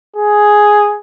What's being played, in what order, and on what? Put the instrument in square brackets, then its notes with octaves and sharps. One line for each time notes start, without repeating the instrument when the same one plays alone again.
[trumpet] G#4